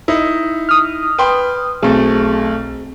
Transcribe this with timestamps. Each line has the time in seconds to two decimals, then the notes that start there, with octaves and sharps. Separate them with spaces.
0.08 D#4 E4
0.69 D#6 F6
1.19 B4 G5 C6
1.83 B1 A3 C4 G#4